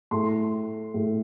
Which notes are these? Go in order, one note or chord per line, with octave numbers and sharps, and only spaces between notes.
A2 C6
A2